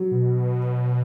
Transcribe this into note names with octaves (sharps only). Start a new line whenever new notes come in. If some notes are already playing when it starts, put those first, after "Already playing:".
Already playing: F#3
B2